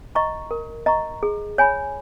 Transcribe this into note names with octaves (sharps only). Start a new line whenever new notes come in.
D#5 A#5 C#6
A#4
D#5 A#5 C#6
G#4
C#5 G#5 B5